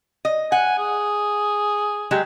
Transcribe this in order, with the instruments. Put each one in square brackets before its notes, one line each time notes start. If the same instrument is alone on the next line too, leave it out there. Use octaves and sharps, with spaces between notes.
[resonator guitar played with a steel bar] D#5
[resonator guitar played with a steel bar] F#5 [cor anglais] G#5
[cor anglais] G#4
[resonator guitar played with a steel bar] F#3 G#3 G4